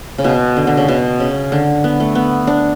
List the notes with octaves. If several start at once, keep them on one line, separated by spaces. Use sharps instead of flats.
C#3
B2
D3
D3
C#3
B2
C#3
D3
B3
A3
B3
D4